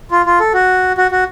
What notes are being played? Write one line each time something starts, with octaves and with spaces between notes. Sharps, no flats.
F4
F4
A4
F#4
F#4
F#4